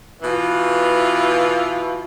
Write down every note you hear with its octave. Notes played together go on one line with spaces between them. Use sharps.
B2 E3 F4